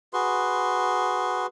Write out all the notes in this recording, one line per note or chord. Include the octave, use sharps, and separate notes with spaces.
F#4 G#4 B4 C6